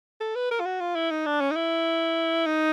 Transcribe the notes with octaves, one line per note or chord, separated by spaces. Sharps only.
A4
B4
A#4
F4
F#4
F4
E4
D#4
D4
C#4
D#4
E4
D#4